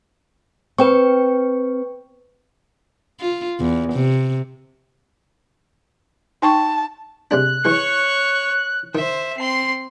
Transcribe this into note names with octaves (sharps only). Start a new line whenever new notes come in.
C4 B4 G5 C#6
F4
E2
C3
D#4 G5 A5 C#6
C3 G#3 D4 F#6
E3 G#3 C#5 C#6
D#3 C5 E5
C4 C6 C7